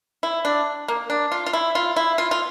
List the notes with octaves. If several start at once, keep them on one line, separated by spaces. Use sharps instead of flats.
E4
D4
A#3
D4
F4
F4
E4
F4
E4
F4
F4